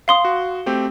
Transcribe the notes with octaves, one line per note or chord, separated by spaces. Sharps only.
F5 C6 D#6
F#4
A3 C4 G4